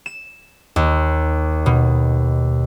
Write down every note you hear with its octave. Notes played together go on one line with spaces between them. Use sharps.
E7
D#2
B2